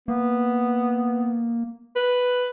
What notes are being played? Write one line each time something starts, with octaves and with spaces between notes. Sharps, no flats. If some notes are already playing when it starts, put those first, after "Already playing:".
A#3 B3
B4